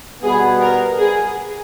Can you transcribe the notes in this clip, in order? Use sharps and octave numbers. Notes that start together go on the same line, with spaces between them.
B2 G3 B3 G#4
A#4
G#4